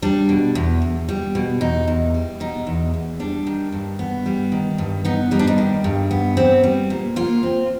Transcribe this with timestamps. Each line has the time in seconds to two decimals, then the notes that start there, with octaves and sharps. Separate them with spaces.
0.02 G3 D4
0.29 B2
0.55 E2
0.82 E2
1.09 G3
1.35 B2
1.61 E2 D#4
1.88 E2
2.14 G3
2.40 B2 D#4
2.67 E2
2.94 E2
3.20 G3 D4
3.47 D#3
3.72 G2
3.99 B3
4.26 G3
4.52 D#3
4.78 G2
5.05 B3 D#4
5.31 G3 D#4
5.39 D4
5.47 D#4
5.58 D#3
5.84 G2
6.11 B3
6.37 C4
6.64 G3
6.90 A#2
7.16 A#2 F4
7.43 C4